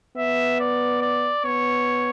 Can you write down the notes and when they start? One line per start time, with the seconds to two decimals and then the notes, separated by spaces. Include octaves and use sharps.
0.16 B3 E5
0.60 D5
1.01 D5
1.45 B3 C#5